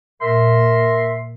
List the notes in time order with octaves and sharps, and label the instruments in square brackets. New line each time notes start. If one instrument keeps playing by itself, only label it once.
[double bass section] A#2 [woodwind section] A#4 E5 C6